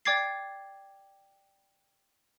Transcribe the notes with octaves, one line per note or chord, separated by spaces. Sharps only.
D5 G5 D6 G#6 A6 C7